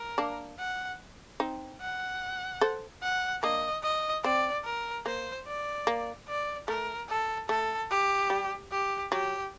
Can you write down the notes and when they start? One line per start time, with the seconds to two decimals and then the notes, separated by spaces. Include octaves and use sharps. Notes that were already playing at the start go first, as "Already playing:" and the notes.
Already playing: A#4
0.18 A#3 D4
0.59 F#5
1.40 C4 D#4
1.81 F#5
2.61 A4 C5
3.02 F#5
3.43 A#3 D4 D#5
3.83 D#5
4.24 C4 D5
4.64 A#4
5.06 A#3 C5
5.47 D5
5.87 A#3
6.28 D5
6.68 A3 A#4
7.09 A4
7.49 A3 A4
7.90 G4
8.30 G3
8.71 G4
9.12 F#3 G4